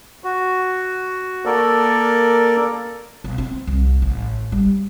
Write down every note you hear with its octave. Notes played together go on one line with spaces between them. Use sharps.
F#4
A#3 A4 A#4 D5
B1
C4
C2
A1
G3